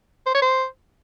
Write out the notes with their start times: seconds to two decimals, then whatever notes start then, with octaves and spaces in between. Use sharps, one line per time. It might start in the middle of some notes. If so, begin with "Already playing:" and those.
0.26 C5
0.34 C#5
0.42 C5